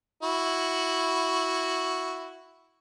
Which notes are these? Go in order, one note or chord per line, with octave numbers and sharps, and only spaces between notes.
E4 F#4